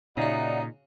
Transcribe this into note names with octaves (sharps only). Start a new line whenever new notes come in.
A#2 C#3 D#4 F#4 D5 E5 F#5